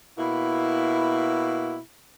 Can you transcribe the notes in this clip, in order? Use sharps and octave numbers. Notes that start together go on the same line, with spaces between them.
B2 A#3 E4